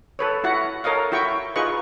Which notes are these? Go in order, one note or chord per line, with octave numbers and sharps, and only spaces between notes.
A4 B4 C#5
E4 F#4 F#5
A4 A#4 C#5 D#5 F5
E4 F#4 G5 C#6
D#4 F4 G#4 B4 D#5 C#6